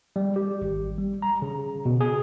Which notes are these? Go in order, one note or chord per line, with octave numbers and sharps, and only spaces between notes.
G3
G4
G#1
G3
A#5
C#3
B2
G#4